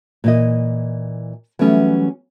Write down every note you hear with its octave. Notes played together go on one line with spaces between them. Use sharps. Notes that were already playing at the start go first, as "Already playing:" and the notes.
A#2 E3 D#5
E3 F#3 G3 A3 B3 C#4